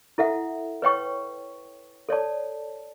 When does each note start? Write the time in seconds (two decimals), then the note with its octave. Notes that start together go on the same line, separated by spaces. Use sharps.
0.18 E4 A4 E5 F#5
0.82 B4 C#5 G5 C#6
2.09 A4 C#5 D5 A5